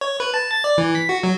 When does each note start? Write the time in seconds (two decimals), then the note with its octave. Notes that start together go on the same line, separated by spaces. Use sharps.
0.01 C#5
0.20 B4
0.34 A5
0.51 A6
0.64 D5
0.78 E3
0.95 B6
1.09 F#4
1.23 F#3